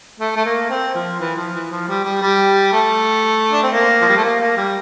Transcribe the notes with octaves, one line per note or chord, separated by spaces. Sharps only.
A3
A3
A#3
C4
F3
E3
F3
E3
F3
G3
G3
G3
A3
D4
C4
A#3
F3
G3
A3
A#3
A#3
G3